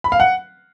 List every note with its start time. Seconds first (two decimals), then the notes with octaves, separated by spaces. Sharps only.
0.04 B5
0.12 F5
0.20 F#5